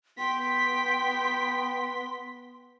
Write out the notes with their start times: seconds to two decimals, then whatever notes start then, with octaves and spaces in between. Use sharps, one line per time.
0.19 B3 G5 C6 B6